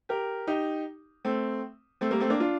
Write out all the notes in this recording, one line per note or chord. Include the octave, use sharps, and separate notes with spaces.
G4 A#4
D#4 G4
A3 C4
A3 C4
G3 A#3
A3 C4
A#3 D4
D4 F4